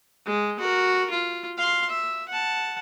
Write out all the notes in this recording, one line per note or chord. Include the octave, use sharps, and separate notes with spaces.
G#3
F#4 A#4
F4
F5 C6
E5
F#5 A5